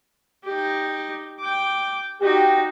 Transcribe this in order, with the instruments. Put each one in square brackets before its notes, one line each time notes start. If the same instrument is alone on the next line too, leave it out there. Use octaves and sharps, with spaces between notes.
[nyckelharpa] D#4 G4
G5 D6
[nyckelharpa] D#4 F#4 [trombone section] G4